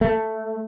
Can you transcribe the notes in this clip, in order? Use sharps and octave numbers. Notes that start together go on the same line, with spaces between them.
A3